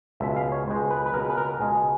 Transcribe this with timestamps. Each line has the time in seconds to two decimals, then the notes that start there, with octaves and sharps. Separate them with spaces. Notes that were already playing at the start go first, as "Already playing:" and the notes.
0.20 C#2 B2 G#3 E5
0.36 F5
0.52 C#5
0.67 C#2 B2 G#3 C5
0.91 B4
1.06 B4
1.13 C#2 B2 G#3 A#4
1.30 B4
1.37 A#4
1.60 C#2 B2 G#3 G#4